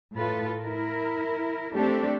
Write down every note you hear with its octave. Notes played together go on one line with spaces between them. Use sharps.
A2 F4 A4 B4
E4 A#4
A3 C4 D4 G4 A4